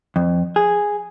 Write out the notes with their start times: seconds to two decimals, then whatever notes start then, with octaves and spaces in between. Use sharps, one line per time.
0.16 F2
0.56 G#4